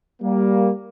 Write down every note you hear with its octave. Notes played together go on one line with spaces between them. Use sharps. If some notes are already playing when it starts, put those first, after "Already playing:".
G3 A#3